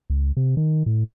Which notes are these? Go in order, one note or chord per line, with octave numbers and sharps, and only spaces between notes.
C#2
C3
D#3
A2